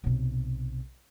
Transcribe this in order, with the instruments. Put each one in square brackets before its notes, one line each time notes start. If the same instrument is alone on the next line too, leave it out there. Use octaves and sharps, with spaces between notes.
[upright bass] B1 C3